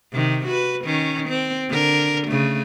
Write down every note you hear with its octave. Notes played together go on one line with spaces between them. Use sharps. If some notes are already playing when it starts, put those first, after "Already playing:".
C3 D#3
F#4 B4
D#3 C#4
C4
D3 A#4
C#3 A3